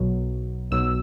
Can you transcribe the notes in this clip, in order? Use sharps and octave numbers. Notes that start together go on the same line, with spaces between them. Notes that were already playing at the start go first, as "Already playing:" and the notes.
Already playing: B1 B2 F#3
B1 B2 F#3 E6